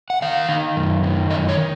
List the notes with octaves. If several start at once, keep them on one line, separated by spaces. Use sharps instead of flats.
F#5
D#3 F5
D#3
F#2
D#3
F#2 D#5
C#5
D#3